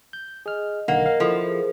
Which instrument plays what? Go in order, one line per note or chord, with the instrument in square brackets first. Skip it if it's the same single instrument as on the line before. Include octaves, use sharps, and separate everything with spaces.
[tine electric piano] G6
[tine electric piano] G#4 F6 [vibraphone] D#5
[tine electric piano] B1 D3 D#3 [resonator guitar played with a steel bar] A#3 [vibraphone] A#4 D#5 [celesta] F#5
[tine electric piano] F5
[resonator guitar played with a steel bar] F3 [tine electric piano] E4 [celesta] A4
[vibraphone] G#4 A#4 C5